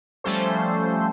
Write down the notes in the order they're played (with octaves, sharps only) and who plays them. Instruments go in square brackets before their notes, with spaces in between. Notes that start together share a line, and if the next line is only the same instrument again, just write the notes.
[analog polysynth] F3 G3 A3 C#4 A4 C5